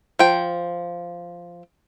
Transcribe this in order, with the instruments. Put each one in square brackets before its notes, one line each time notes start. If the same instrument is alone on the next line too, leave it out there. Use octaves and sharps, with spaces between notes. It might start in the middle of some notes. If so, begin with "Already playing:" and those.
[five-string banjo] F3 G5